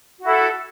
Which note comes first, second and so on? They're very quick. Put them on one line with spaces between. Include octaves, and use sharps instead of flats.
F#4 E4 A4